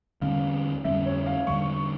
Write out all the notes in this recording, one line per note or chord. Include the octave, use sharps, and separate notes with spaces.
E2 D3 G3 C#4 F5
F2 D3 G3 C#4 E5
C#5
F5
E2 D3 G3 C#6